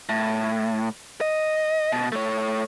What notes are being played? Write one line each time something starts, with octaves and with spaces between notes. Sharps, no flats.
A2
D#5
B2
A3 C#5